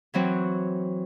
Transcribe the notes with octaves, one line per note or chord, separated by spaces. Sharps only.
E3 F#3 C4 F#4